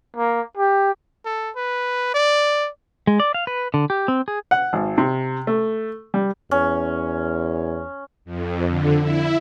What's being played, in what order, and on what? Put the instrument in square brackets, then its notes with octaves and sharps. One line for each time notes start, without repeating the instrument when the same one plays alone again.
[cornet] A#3
G4
A4
B4
D5
[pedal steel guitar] G#3
D5
F5
B4
D3
G4
C4
G#4
[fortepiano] F#5
G#1
C3
A3
G3
[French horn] E2 [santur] C#4
[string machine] F2
D3
E4